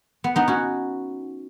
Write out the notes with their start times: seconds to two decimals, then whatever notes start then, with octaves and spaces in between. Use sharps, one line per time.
0.24 B3
0.36 B3 D#4
0.48 C#4 F#4